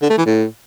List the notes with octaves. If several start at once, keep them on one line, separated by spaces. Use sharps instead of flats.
D3
A3
E3
A2